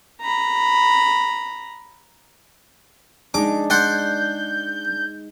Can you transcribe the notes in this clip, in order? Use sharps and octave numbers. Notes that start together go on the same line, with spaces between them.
A#5 B5
G#3 D4 D#4 D6
D5 F#5 C6 G6